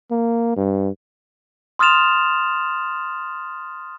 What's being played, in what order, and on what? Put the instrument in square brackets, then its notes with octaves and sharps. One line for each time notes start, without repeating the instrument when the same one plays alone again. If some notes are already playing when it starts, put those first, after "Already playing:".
[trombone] A#3
G2
[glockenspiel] C6 D#6 F6 A6 E7 F7